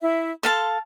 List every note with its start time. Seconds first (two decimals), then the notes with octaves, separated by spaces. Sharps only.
0.02 E4 E5
0.43 A4 F5 A5 C6